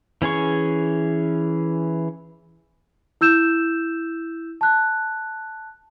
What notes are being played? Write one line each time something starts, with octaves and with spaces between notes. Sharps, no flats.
E3 C#4 G#4 C#6
E4 E6 G6 E7
A5 F#6